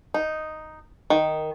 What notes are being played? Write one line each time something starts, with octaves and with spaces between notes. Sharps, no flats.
D#4
D#3